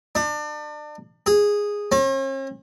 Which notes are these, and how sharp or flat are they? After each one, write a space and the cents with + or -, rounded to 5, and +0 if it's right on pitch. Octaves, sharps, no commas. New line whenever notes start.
D4 +35
G#4 -10
C#4 -45